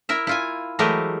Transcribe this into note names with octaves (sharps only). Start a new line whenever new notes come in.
E4 A#4 E5
E4 F4 G#5
E3 F#3 G#3 A3 G4 A#4